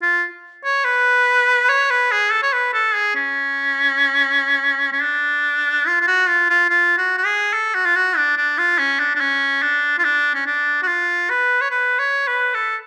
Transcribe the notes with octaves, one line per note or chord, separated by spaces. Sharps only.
F4
C#5
B4
C#5
B4
G#4
A4
C#5
B4
A4
G#4
C#4
C#4
D4
F4
F4
F#4
F4
F4
F4
F#4
F#4
G#4
A4
F#4
F4
F#4
D4
D4
F4
C#4
D4
D4
C#4
D4
F4
D4
C#4
D4
F#4
F4
B4
C#5
B4
C#5
B4
A4